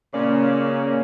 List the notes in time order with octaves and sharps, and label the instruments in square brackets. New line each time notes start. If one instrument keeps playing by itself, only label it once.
[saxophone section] A#2 C#3 D5 [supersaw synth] A#3 C#4